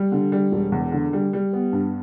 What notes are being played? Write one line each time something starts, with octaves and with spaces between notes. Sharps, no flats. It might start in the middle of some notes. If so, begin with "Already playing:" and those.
Already playing: G3
D3
G3
E1
E2
D3
G3
G3
B3
G2